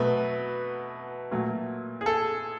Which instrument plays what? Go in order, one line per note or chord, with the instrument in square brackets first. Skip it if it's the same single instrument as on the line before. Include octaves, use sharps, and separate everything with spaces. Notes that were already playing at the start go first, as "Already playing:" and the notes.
Already playing: [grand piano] B2 F#3 A3 B4
A#2 F#3 A3
G#4
A4